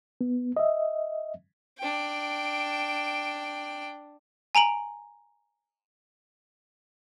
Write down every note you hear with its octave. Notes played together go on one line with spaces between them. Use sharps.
B3
D#5 E5
D4 G5
G#5 A#5 D7 F#7